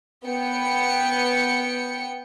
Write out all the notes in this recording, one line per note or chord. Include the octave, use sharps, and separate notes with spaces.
B3 G5 C#7